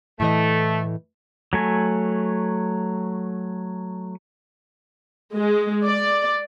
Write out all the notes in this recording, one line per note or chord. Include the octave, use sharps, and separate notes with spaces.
A2 E3 A3 D#5
F#3 A3 G#5
G#3
D5